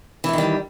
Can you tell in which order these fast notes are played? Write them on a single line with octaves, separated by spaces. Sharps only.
E3 A3 D#3 G3